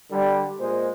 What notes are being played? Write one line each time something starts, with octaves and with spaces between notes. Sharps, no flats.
D3 G3
A#2 G#3 C5